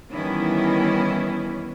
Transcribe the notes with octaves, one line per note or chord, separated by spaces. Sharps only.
D#3 E3 G3 B3 C#4 E4